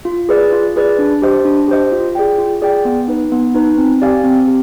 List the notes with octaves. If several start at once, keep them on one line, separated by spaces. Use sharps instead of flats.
F4
G#4 B4 D5
F4
G#4 B4 D5
D4
G4 C5 D#5
D4
G4 C5 D#5
F4
G#4 D5 G5
F4
G#4 D5 G5
B3
D#4 B4
B3
D#4 B4
C4
G4 D5 F5 G#5
C4
G4